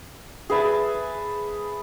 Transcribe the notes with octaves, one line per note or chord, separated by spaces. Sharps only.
G#4 B4 E5 A5